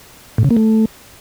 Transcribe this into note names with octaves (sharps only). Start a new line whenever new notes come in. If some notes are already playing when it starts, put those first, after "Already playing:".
A2
C#3
A#3
A3